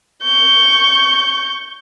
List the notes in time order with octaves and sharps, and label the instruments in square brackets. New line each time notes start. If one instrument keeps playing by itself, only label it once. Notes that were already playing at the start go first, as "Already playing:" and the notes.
[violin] C#6 G6